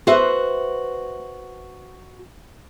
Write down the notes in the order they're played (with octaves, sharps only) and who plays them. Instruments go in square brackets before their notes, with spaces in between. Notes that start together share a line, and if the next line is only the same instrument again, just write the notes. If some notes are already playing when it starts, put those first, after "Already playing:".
[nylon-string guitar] F#4 B4 C5 E5